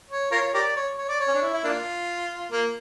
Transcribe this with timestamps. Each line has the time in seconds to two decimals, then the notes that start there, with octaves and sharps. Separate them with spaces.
0.10 C#5
0.31 F4 A#4 C#5
0.54 G4 A#4 D5
0.76 C#5
0.97 C#5
1.09 D5
1.20 C#5
1.28 C#4
1.34 D4
1.42 E4
1.53 E4
1.64 A#3 D4 F4
2.52 A#3